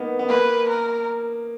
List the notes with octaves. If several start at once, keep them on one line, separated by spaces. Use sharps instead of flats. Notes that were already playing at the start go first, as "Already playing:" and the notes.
Already playing: A#3 B3 D#4
B3
A#3 B4
A#4